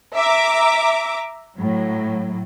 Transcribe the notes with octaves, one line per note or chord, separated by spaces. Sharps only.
E5 A#5 D6
A2 F#3